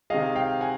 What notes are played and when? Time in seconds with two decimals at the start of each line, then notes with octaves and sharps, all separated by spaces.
0.10 C3 D#3 G#3 D#5 F5
0.36 F5 G5
0.61 F#5 G#5